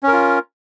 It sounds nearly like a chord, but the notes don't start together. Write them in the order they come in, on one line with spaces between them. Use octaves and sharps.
C#4 A#4 F4